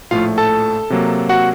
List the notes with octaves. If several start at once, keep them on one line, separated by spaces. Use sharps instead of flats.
A#1 A2 F3 A3 F4 F5
A4 A5
C3 F#3 A#3
F#4 F#5